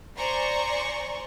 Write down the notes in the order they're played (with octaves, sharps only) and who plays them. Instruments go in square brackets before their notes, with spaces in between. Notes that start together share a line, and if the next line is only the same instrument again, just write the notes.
[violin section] C5 D5 G#5 A#5 C6 C#6